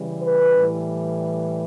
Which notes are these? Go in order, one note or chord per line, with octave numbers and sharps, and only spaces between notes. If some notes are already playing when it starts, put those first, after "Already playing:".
Already playing: C#3 E3 G3
B4
A2 E3 G3